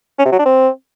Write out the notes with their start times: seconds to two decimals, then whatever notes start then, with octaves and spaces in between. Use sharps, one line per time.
0.19 C#4
0.25 C3
0.32 F#3
0.39 D4
0.46 C4